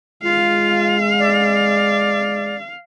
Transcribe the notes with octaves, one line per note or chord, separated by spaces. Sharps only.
G#3 F4 F5
D5